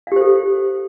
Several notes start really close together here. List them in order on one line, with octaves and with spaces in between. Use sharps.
F5 G4 C5 A4